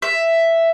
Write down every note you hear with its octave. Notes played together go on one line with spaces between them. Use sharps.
E5